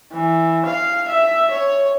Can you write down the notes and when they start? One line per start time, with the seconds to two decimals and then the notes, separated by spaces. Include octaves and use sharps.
0.12 E3
0.65 F5
1.08 E5
1.51 C#5